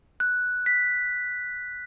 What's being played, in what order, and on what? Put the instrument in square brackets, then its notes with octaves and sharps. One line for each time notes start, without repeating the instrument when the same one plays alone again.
[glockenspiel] F#6
B6